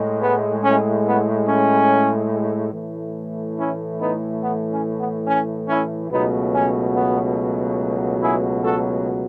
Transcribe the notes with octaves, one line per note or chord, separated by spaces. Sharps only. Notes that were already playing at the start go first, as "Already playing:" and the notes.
Already playing: A2 G#3
B3
C#4
B3
C#4
A2 E3 A3
C#4 E4
B3 D#4
B3
C#4
B3
C#4
C#4 E4
C#2 B2 F#3 A3 B3 D#4
C#4
B3
E4 G#4
F#4 A4